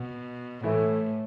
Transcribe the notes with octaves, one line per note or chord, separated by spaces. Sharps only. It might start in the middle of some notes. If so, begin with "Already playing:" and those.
Already playing: B2
A2 E3 A3 E4